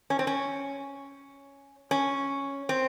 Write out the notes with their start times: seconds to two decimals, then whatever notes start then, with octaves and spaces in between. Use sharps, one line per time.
0.10 C#4
0.19 C4
0.27 C#4
1.91 C#4
2.69 C4